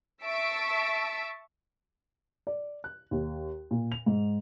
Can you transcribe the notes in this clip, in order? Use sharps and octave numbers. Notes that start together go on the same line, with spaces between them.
E5 A5 C#6 E6 B6 D7
D5
F#6
D#2
A#2
F7
G#2